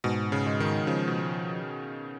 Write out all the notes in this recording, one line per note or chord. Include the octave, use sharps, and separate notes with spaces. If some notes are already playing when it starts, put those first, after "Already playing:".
G#2 B2
C#3
G#3
D#3
C#3 F3
B2